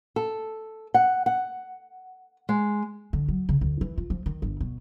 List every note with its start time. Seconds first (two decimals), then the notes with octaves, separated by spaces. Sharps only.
0.16 A4
0.94 F#5
1.26 F#5
2.49 G#3
3.13 D3
3.28 F#3
3.49 C#3
3.61 D2
3.81 E3
3.98 F4
4.10 F3
4.26 D#3
4.42 G1
4.61 B2